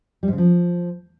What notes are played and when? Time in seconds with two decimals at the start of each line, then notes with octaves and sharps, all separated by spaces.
0.23 G3
0.28 G#2
0.33 C#3
0.38 F3